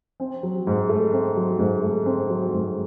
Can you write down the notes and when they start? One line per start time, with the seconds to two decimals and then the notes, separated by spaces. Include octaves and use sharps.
0.20 C4
0.43 F#3
0.67 G#2
0.89 A3
1.13 C4
1.37 F#3
1.59 G#2
1.83 A3
2.06 C4
2.30 F#3
2.53 G#2